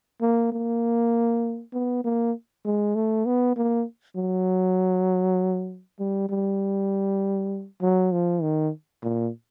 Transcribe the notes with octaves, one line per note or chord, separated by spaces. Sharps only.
A#3
A#3
B3
A#3
G#3
A3
B3
A#3
F#3
G3
G3
F#3
F3
D#3
A#2